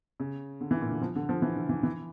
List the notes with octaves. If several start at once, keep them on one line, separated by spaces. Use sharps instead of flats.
C#3
D3
E3
A#2
D3
F3
D3
F3
E3
D3
E3
E3